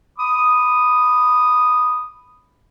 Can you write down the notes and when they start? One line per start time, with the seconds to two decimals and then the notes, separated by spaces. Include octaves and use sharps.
0.19 B5 D6 D#6